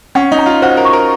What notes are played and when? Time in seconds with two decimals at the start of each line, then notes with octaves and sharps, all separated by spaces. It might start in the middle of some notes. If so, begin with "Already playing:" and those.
0.15 C#4 F#5
0.32 D#4
0.39 A#5
0.46 F4
0.62 F#4 C5
0.77 A#4
0.85 C#6
0.93 A#4